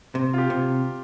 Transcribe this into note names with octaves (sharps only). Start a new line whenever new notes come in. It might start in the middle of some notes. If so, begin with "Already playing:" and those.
C3
F4
G4
C3